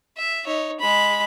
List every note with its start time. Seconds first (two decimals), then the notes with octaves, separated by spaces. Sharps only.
0.17 E5
0.46 D#4 C#5
0.80 G#3 B5